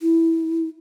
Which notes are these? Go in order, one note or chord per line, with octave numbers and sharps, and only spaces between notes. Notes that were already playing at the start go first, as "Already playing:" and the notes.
E4